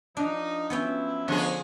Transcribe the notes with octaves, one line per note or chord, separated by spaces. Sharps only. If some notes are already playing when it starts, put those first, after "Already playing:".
F3 D4 D#4
F3 F#3 B3 C#4 E4 G5
D3 F3 G#3 B3 G#4 C#5